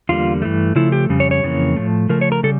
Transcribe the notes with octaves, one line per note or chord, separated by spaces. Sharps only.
E2 D3 G3 A#3 F4
G2 E3 A3
C#3 F3 A3 E4
G4
F2 C#3 G3
C#5
C#5
F2 C#3 E3 A#3
A2 F3 A3
C#3 F3 A3 A#4
C#5
A#4
C#3 G3 A4